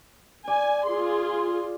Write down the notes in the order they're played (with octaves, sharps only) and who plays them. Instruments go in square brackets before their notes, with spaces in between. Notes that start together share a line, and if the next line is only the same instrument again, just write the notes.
[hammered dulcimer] D5 [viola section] G#5
[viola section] F4 G#4 C6